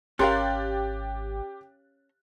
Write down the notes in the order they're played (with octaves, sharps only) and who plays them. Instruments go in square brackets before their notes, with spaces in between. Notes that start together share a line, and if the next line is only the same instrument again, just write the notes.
[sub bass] G#1 [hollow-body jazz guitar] C#4 A#4 [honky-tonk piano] G4 F#6 A6 [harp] F5 C6